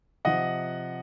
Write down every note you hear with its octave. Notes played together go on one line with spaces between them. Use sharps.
C3 F3 D#5 F#5